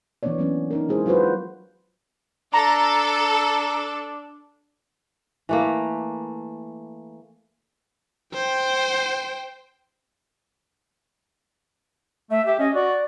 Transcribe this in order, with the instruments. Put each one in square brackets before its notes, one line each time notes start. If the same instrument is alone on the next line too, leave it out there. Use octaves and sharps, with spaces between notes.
[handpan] E3 A#3 B3 D4 C#5 D5
E3 F#3 C#4 D4
D4 D#4 A#4
G#3 E4 G#4 C5
F#3 F4 F#4 B4 C5
[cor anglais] D4 [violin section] A4 [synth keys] A#5
[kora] E3 A3 A#3
[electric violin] C5 G5
[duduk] A3 [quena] E5
[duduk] G4 [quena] E5
[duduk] C#4 [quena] D#5
[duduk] F#4 [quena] D5